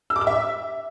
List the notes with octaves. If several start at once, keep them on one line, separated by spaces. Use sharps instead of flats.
E6
D6
E6
E5